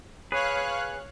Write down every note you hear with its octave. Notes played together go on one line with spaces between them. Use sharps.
G#4 B4 C#5 F5 F#6